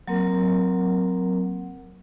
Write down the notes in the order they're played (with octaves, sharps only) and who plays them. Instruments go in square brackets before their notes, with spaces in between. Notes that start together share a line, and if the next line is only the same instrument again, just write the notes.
[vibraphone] F#3 A#3 C4 A#4 F#5